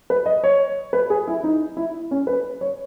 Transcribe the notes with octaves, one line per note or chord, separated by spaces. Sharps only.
B4
D#5
C#5
B4
G#4
E4
D#4
E4
C#4
B4
C#5